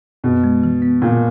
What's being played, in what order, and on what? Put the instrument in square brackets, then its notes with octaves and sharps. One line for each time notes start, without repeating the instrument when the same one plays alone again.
[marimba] F#2 [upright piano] B2
[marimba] G#3
E3
B3
[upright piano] A#2 [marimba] C#3